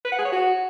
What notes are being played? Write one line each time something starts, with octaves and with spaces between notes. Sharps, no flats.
B4
F#5
G#4
C#5
F#4